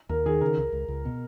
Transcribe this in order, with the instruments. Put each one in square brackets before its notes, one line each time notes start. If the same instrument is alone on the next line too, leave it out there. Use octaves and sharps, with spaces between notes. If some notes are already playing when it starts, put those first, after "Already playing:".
[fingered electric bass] D#2 [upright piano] A#4
[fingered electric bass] D#3 [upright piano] G#4
[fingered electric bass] C#3 [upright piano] A#4
[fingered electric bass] C#2
C#2
C#2
B2